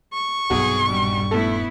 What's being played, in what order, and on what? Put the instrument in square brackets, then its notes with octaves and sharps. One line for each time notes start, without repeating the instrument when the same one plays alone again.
[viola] C#6
[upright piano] B1 F#4 [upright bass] G2 C3 [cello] G#4
[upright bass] D#1 G2 [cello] G3
[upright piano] A3 A4 [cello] B3 E4